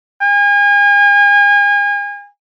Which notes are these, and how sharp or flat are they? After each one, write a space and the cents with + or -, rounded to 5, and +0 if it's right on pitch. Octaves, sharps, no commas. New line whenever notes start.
G#5 -35